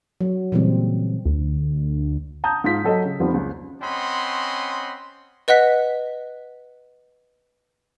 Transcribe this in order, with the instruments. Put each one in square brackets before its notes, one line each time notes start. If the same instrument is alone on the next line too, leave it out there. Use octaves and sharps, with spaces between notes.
[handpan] F#3
A#2 C#3 E3 F#3 G3 C4
[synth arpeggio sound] D2
[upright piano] A5 A#5 D#6 G6
G#2 F4 B6
F#3 A4 D#5
C#3
F2 D#3 F3 G3 B3 C4
C#2
[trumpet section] C4 C#4 D#5 F#5 B5 C6
[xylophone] B4 D#5 F#5 F#6 B6